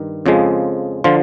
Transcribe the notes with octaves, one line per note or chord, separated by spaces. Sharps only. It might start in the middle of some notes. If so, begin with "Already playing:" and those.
Already playing: G2 D#3
F2 C#3 F3 G#3
D3 F3 F4